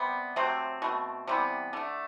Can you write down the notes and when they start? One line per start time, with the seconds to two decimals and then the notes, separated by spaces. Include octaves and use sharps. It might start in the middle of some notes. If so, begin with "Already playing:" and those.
Already playing: C3 G3 B3
0.36 C3 F#3 A3 C4
0.82 B2 A3
1.28 C3 E3 G3 B3
1.73 D3 A3